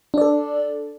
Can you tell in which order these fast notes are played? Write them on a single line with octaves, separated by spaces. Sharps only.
D4 D5 A4